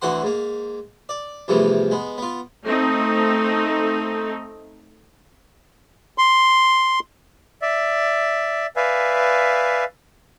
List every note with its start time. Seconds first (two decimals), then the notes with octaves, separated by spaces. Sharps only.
0.02 D2 D3 E3 F#4 F#5 C6
0.23 G#2 A#3
1.09 D5
1.48 E2 G2 C3 E3 F3 A3
1.91 G#3 B3
2.18 B3 F4
2.64 A3 C4 D#4
6.18 C6
7.62 D5 E5
8.76 B4 D5 E5 F5 G#5